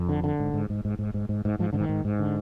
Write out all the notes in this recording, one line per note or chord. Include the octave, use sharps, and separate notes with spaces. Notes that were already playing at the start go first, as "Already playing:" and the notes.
Already playing: F2
D3
D3
G#2
G#2
G#2
G#2
G#2
G#2
G#2
G#2
G#2 F3
G#2 D3
D#3
G#2
G#2
D3